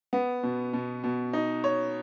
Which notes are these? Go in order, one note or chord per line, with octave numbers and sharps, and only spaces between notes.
B3
B2
B2
B2
D#4
C#5